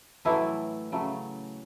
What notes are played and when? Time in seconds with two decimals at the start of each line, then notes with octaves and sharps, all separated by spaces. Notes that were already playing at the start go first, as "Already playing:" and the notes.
0.25 A2 E3 F#3 A3 E4
0.92 C#3 F#3 A3